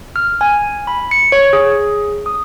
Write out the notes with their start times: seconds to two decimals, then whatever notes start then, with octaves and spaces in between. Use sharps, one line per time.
0.16 F6
0.41 G#5
0.87 B5
1.11 C#7
1.32 C#5
1.53 G#4
2.26 D#6